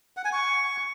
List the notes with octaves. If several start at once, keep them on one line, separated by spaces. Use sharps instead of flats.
F#5
G#5
C#6